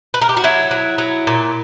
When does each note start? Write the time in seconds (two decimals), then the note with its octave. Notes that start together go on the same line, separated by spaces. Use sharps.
0.14 B4
0.22 A#4
0.29 G4
0.37 F#4
0.44 F#3 E4
0.71 F#3
0.98 F#3
1.27 A#2